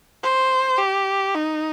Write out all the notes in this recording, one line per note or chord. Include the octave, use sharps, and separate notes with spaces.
C5
G4
D#4